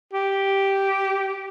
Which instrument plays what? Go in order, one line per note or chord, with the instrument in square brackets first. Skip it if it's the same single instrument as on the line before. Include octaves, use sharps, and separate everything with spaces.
[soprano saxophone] G4